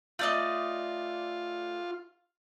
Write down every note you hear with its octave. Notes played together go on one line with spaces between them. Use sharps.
A3 F4 D5 D#5